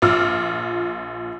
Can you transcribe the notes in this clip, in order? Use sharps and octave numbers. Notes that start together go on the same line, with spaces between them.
A#1 F4 D6 E6 F6